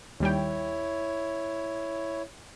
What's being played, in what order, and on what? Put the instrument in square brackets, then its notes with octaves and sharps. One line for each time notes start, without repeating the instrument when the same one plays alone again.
[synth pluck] D#2 G3 G5 [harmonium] E4 C#5